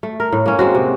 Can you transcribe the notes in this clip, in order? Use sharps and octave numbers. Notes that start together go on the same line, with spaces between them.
A3
A#4
A2
A#3 C#4
G#3 C4 F#4
C3